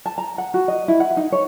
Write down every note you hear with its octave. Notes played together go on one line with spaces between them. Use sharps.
A5
A#5
F#5
F#4
D#5
E4
F#5
D#4
C#5